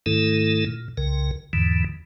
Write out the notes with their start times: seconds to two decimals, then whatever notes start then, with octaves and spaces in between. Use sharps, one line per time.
0.06 G#2 D#3 A3 E4 A4
0.66 A#2
0.97 C2 C#3 A#4
1.53 E2 G#2 D3 E3